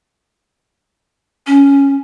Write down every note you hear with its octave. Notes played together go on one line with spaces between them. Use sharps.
C#4